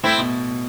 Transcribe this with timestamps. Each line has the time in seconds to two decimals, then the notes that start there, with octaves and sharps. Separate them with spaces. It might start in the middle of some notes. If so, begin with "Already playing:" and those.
0.03 A2 C4 E4
0.18 B2